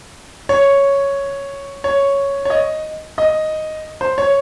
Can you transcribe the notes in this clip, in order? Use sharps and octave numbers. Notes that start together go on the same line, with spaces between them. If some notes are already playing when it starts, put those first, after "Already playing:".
C#5
C#5
C#5
D#5
D#5
C5
C#5